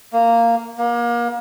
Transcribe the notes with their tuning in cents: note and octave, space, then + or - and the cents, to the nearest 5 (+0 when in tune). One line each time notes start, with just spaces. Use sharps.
A#3 -10
A#3 +30